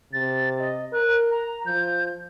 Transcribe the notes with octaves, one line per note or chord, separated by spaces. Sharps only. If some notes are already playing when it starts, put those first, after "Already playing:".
C3 A6
D#5
A#4 F#6
A#5
F3 G6